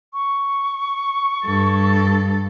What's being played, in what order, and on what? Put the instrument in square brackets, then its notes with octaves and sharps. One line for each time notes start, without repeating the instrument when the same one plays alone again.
[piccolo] C#6
[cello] G2 A4